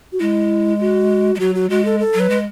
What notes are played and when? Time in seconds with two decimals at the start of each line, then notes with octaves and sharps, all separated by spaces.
0.13 F#4
0.20 G#3 E4
0.81 F#4
1.35 G#3
1.40 F#3 F#4
1.55 F#4
1.70 G#3 F#4
1.85 A4
2.00 A4
2.14 F#3
2.20 B4
2.30 G#3